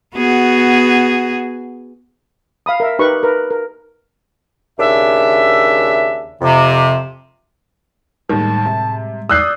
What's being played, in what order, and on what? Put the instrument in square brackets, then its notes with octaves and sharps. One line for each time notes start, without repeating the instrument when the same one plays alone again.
[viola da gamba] B3 F#4 G#4
[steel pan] F5 B5 D#6
A#4 E5
D#4 G4 A#4 B4 C#6
A#4 B4
A#4
[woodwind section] D#2 C#3 D4 E5
F2 C3
[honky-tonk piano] D#2 D#3 [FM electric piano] A2 G3 G#3 [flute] A5
[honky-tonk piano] C3
[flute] D5 [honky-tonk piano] D#6 G6 [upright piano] E6 F#6 C7